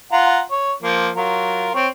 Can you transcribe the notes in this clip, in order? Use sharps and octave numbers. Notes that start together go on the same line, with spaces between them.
F4 F#5 A#5
C#5
F3 A#3
F#3 F4 A#4
C4 C#5